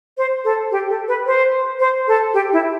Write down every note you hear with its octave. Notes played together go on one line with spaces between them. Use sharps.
C5
A4
G4
A4
B4
C5
C5
A4
G4
E4